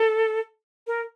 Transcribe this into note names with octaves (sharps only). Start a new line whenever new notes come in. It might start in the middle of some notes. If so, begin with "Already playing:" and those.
Already playing: A4
A#4